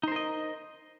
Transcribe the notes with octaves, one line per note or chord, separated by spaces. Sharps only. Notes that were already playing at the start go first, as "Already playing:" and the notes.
D#4 A#4 C5 D#5